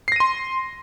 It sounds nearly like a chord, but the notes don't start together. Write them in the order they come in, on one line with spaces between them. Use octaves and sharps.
C7 A#6 D#7 C6